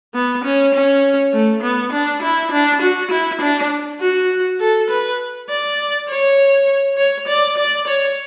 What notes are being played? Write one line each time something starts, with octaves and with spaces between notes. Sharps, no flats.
B3
C#4
C#4
A3
B3
D4
E4
D4
F#4
E4
D4
F#4
A4
B4
D5
C#5
C#5
D5
D5
C#5